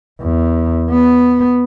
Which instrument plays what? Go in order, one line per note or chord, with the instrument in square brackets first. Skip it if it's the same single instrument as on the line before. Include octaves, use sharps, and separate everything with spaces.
[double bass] E2
B3